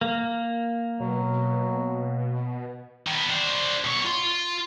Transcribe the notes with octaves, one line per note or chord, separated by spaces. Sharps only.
A#3
B2 F#3
D#3 B3
D4 C5
B2 C#5
F4 C6